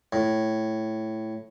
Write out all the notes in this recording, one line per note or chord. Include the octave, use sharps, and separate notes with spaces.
A2